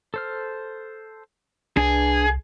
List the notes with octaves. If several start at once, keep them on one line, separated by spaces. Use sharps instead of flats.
A4 C5 F6
C2 D4 G#4 B4